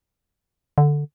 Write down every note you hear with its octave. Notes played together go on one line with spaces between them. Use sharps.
D3